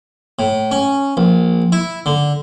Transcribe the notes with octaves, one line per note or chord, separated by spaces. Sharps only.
A2
C#4
A#1
E4
D3